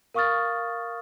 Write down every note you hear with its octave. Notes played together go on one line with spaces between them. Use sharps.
A#4 F5 C#6 D#6 F6 A6